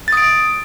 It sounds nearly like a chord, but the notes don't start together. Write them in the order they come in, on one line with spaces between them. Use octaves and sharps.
A6 D#6 D7